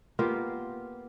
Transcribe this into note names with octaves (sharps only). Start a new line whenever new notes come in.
A#3 B3 F4 G4